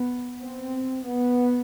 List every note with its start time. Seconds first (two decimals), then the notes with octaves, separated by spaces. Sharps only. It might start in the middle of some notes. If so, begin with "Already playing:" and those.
Already playing: B3
0.41 C4
1.08 B3